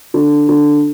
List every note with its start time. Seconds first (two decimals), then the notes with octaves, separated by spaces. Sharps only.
0.14 D3
0.49 D3